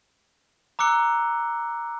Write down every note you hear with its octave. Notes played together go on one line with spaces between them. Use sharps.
A#5 D6 E6 F#6 C#7 G7